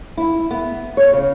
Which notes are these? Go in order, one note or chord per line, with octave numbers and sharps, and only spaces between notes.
E4
B3
C#5
C#3